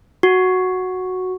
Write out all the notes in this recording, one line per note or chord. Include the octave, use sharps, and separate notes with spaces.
F#4